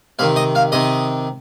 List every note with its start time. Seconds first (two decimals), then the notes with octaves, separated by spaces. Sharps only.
0.19 C3 D#3 F5
0.36 D#5
0.55 F5
0.72 C3 D#3 D#5